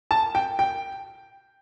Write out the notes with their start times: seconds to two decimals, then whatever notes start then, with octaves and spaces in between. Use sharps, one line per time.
0.11 A5
0.35 G5
0.59 G5